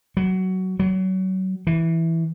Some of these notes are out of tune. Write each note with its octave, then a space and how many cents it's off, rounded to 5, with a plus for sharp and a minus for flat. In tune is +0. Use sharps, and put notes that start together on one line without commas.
F#3 +15
F#3 +30
E3 -5